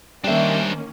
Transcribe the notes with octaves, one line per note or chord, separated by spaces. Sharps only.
D#3 G3 A#3 C#4 D4 C5 E5 G5